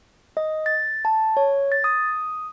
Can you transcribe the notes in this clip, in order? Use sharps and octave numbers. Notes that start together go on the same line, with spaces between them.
D#5
A6
A5
C#5
A6
D#6